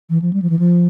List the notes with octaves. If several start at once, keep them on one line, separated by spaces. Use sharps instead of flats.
E3
F3
G3
F3
E3
F3